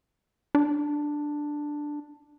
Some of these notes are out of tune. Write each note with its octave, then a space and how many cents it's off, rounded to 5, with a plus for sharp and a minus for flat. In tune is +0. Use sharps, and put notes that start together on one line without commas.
D4 +5